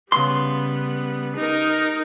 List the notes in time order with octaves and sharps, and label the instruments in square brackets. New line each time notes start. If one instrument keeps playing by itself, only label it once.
[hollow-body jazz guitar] C#3 C6 [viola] G3 B3
[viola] D#4 A#4